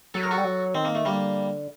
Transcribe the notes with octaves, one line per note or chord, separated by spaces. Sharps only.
F#3 A4
A#4
F#4 A4
G3
F#3
D#3 C4
A#3
A3
D3 G3 A#3